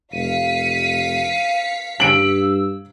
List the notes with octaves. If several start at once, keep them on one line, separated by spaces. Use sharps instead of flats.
F1 F5 B6 C#7 D#7
G2 E6 D7 F#7